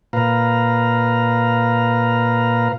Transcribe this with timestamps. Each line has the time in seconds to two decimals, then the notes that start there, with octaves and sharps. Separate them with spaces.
0.13 A#2 B4 F5 A#5